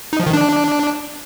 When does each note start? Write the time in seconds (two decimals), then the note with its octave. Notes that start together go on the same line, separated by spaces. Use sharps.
0.13 D#4
0.20 F3
0.26 D#3
0.33 D4